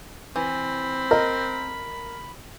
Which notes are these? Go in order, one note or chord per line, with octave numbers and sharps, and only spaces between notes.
E3 C4 B5
A#4 D#5